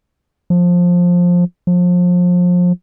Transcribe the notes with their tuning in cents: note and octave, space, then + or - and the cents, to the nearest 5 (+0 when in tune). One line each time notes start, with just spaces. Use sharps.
F3 +15
F3 +30